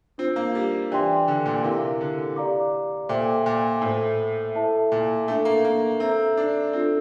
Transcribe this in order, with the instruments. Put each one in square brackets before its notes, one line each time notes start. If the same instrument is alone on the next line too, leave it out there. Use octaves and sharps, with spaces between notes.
[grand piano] C4 [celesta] D4 F4 C5
[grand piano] A#3
G3
[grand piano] E3 [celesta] D4 G4 D5 G5 C6
[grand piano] D3
A#2
[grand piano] C3 [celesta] E4 G4 A#4 F5
[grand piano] D3
[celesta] G4 D5 F5 A#5 D6
[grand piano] A#2 [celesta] A4 C5 E5 G5 D6
[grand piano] A#2
[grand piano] A2 [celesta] A4 C5 E5
[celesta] E4 A4 E5 A5
[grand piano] A#2
[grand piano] A3 [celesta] D4 A4 E5
[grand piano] A#3
A#3
[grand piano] C4 [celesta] A4 E5 A#5
[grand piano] D4
[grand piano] C4 [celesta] D4 F4 A4